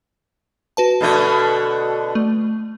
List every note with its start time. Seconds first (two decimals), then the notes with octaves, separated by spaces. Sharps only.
0.77 F#4 B4 A5
1.01 B2 D3 A3
2.15 A3